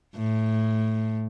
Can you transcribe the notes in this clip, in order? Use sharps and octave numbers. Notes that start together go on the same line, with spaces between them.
A2